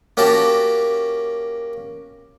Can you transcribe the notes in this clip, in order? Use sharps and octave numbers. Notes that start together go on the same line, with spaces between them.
A#3 C#4 F#4 G4 A5